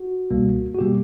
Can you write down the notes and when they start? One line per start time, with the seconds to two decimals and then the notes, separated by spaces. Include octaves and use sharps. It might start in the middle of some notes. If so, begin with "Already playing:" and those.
Already playing: F#4
0.31 C#2 B2 G3 A#3
0.74 F#4
0.79 B2 G3 A#3 G4